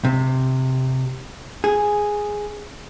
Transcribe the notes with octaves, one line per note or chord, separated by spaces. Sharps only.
C3
G#4